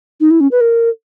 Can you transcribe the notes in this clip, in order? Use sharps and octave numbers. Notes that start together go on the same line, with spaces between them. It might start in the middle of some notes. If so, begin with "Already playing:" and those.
D#4
E4
C#4
B4
A#4